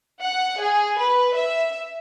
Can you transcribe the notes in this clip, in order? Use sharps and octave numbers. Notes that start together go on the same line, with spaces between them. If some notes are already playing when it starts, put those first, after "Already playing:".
F#5
G#4
B4
E5